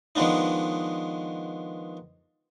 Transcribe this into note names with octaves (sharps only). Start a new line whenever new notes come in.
D#3 F3 G#3 B3 D4 D#4